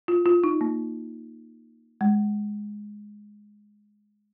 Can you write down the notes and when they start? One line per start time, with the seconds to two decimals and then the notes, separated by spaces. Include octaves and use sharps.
0.08 F4
0.26 F4
0.44 D#4
0.61 A#3
2.01 G#3